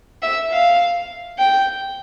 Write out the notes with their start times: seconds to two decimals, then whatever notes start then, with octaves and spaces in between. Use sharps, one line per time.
0.22 E5
0.52 F5
1.39 G5